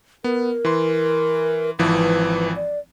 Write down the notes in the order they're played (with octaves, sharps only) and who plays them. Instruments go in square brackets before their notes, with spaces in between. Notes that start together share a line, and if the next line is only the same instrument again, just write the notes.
[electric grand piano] B3 [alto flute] A#4
[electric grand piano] E3 C6
[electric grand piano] G#1 E3 F3 [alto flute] B4
[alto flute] D5